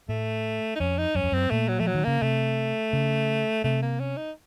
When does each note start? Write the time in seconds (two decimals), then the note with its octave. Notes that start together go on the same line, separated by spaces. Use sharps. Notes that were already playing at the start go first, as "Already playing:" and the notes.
0.09 A2 A3
0.76 D#4
0.80 F2 C#4
0.98 D#4
1.15 F#2 C#4
1.24 F2
1.32 F#2 C4
1.51 A#2 A3
1.68 F#3
1.79 F3 A3
1.87 F#3
1.94 D#3
2.04 C#3 A#3
2.22 C3 A3
2.93 C#3
3.64 C3 A3
3.82 A#3
4.00 C#4
4.17 D#4